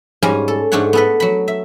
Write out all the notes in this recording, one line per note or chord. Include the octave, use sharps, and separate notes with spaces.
G#2 G3 C#4 F5 G#5 A#5
A4
G#2 A3 D4 C#5 F#5
B3 A4 B4
F#3 B5
E5